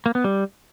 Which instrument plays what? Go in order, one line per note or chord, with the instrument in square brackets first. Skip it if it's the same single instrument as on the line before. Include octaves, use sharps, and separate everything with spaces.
[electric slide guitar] A#3
B3
G3